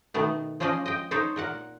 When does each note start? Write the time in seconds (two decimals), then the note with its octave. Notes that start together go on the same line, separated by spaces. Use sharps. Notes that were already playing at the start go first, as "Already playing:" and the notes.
0.14 B2 D#3 A3 B3
0.60 F3 C#4 D4 C5 D5 D#5
0.86 D#5 G5
1.11 D4 D#4 A4 C5 C#5
1.36 A#2 A#4 F#5